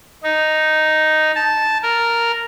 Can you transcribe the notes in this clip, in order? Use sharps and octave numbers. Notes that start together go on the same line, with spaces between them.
D#4
A5
A#4